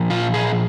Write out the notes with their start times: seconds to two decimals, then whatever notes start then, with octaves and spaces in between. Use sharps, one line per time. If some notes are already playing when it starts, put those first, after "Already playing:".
Already playing: A#2 F3
0.10 F4
0.34 G#4